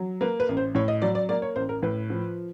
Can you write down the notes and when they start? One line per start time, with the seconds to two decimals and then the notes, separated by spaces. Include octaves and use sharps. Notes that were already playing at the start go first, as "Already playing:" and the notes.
Already playing: F#3
0.21 A#3 B4
0.40 B4
0.49 A1
0.57 C5
0.75 A2 C#5
0.88 D#5
1.02 F#3 D5
1.15 D5
1.29 A#3 D5
1.42 C#5
1.56 A1 C5
1.69 A#4
1.83 A2 B4
2.10 F3